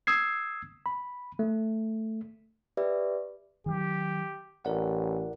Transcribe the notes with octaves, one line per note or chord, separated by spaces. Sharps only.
D#6 E6 G#6 C7
B5
A3
G4 B4 D5 E5
D#3 E3 F#3 G4
A1 A#4 D5 F#5